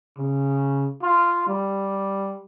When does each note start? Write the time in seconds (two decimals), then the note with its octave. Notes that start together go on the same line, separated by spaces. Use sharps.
0.17 C#3
1.02 F4
1.47 G3